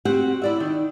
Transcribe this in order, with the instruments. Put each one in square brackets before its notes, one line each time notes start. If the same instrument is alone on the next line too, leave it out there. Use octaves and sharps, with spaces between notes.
[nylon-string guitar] C4 F#4 G4 F#5
E4 D5 E5
D#3